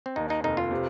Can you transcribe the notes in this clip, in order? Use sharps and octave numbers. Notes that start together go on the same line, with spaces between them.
C4
D#2 D#4
D#4
F1 D#4
F4
C3